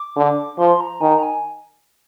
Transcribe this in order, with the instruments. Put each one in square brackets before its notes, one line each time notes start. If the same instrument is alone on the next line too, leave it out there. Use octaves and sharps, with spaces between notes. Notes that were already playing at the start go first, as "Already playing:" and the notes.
Already playing: [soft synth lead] D6
[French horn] D3
[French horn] F3 [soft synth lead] C6
[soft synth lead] A#5
[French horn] D#3 [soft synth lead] G#5
[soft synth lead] A#5
G#5